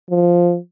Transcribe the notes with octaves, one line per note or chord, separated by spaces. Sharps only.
F3